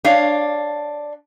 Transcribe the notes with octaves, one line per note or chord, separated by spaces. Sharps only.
D4 C#5 F5